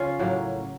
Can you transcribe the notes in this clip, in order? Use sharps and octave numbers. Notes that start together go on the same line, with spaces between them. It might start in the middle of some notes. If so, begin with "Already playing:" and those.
Already playing: C#3 C#4 F4
A2 F#3 A#3